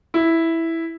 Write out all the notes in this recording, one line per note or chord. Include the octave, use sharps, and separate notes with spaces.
E4